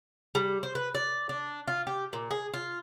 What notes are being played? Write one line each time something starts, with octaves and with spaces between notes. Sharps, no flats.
G3
C5
B4
D5
D4
F4
G4
A#2
G#4
F4